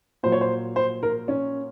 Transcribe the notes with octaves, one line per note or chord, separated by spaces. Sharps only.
A#2 F#3 C5
C#5
C5
C5
A#4
C#4